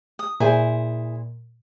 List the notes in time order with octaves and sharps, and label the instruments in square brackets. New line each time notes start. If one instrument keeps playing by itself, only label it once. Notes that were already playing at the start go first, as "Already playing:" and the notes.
[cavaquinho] D#6
[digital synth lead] A#2 [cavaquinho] E4 G#4 C5